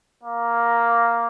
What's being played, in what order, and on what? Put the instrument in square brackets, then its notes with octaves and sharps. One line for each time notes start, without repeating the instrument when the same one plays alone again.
[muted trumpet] A#3